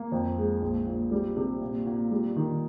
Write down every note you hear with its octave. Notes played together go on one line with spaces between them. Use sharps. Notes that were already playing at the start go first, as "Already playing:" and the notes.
Already playing: A#3
F2
G#3
A#1
A#2
G3
C3
A#2
A#2
G3
D#3